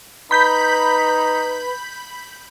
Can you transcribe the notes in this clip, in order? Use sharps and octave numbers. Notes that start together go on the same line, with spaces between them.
D#4 B4 B5 G6 B6